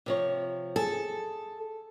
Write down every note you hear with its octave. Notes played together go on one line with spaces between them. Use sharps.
C3 F3 C#5
G#4 A4